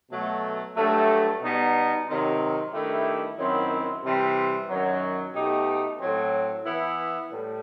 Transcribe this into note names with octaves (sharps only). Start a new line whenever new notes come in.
B2 F#3 A3
G2 F#3 A3
B2 G3 B3 D#4
C3 D#3 F#3 C4 D#4
G2 D#3 A3 E4 G4
F#2 D#3 F#3 C4 E4
C3 E3 G3 C4
F#2 D#3 F#3
B2 A3 D#4 G4
A2 F#3 C4
E3 B3 E4
A2 G3